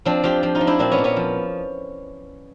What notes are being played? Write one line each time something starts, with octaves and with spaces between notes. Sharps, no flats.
F3 C4 D4
F3 F4 G4
F3
D#4 F4
F3
D4 E4
A#2 C4 D4
B3 C#4
A#2
B3 C#4
F3